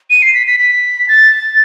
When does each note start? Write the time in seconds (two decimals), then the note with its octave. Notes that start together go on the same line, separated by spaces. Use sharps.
0.10 D#7
0.22 C7
0.34 B6
0.47 B6
0.60 B6
1.08 A6